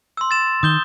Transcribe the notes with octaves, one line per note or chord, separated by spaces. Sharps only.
C6 E6
A6 E7
D#3 D#6 G6 G7